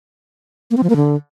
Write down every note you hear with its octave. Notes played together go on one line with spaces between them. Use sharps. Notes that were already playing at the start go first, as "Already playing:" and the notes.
A#3
C4
F3
A#3
D3